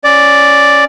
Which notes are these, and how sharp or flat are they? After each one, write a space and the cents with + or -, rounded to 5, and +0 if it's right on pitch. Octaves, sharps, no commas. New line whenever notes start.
C#4 +0 D5 +0